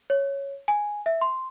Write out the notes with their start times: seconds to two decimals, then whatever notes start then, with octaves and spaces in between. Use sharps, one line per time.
0.10 C#5
0.68 G#5
1.06 E5
1.21 C6